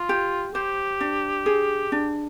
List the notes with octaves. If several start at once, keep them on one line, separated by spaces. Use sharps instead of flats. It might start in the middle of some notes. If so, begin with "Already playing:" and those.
Already playing: F4
G4
G4 C5
D4
G#4
D4